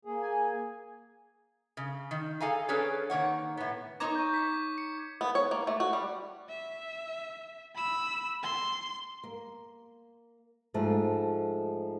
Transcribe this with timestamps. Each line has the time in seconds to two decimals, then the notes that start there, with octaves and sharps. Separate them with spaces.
0.05 A#3 G#4
0.22 G#5
1.77 C#3
2.11 D#3
2.41 G#4 A4 F5 G#5 A#5
2.69 C#4 D4 G#4 A4 B4 C#5
3.10 D#3 A#3 C#5 F#5
3.57 A2 B3
4.00 D#4 C#5 A#5 D6 G#6
4.15 C#6 G6
4.34 B6
4.78 C#7
5.21 B3
5.35 C#5
5.51 A#3
5.67 A3
5.80 F#4
5.93 G3
6.49 E5
7.75 B5 E6
8.43 C6
9.24 A#3
10.74 G#2 F3 A3